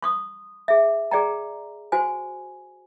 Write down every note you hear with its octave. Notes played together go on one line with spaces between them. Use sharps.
C6 C#6 D#6
G#4 E5
G#4 D5 G5 A#5
F#4 C5 G#5